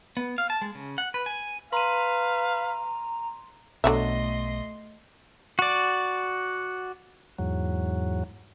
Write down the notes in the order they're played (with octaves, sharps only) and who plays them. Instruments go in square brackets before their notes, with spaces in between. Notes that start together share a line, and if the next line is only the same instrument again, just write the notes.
[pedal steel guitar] B3
F5
A5
G#3
C#3
F#5
B4
G#5
[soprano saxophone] B4 [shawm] F5 [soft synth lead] A#5 [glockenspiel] C6 D#7
[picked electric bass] B1 B3 [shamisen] D3 F#3 E5 [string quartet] A3 D#5 C6
[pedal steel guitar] F#4 D5
[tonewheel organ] E2 G#2 F#3